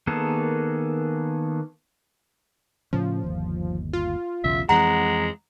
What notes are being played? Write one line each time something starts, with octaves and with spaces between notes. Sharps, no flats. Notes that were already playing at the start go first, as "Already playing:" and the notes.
D#3 A#3 B3 G#4 A4
A2 C#3 F3 C#4
G1 D#2
F4
B1 E2 C#3 E5
F2 E3 G#3 C4 F#5 A#5